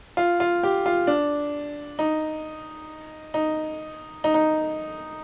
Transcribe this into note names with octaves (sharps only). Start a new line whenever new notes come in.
F4
F4
G4
F4
D4
D#4
D#4
D#4
D#4